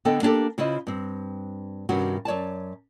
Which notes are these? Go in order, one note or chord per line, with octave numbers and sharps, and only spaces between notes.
D3 B3 A4 D#5 G5
A#3 D4 D#4 G4 A4
C#3 E4 F4 C5 D#5
G2 C4
G2 C3 D#3 C#4 F#4
F#2 C#5 D5 A5